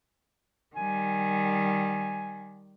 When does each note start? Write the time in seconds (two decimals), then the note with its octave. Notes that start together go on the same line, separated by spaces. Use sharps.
0.76 D#3 G3 G#5